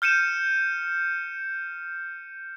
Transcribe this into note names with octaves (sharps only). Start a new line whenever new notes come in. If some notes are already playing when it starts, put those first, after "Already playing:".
F6 G6 C#7 D#7 E7